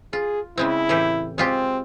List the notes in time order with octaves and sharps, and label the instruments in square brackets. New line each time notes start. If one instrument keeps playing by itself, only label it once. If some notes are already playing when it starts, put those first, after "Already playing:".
[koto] F4 [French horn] G#4
[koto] C#3 G#3 C4 [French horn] E4
[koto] A2 E3 G4
[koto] G#3 F4 G4 [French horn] C4